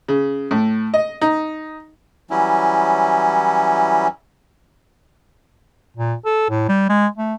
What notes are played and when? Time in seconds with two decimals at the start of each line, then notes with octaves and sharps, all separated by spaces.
0.08 C#3
0.51 A2
0.94 D#5
1.21 D#4
2.30 E3 F#3 G3 C#4 E4
5.97 A#2
6.25 A4
6.50 A2
6.69 G3
6.89 G#3
7.18 A3